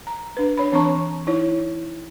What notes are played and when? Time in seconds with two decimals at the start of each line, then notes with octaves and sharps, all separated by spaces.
0.07 A#5
0.37 D4 B4
0.57 D4 C#5 B5
0.72 E3 C4 D4 A5 A#5 C#6
1.27 D#4 E4 C#5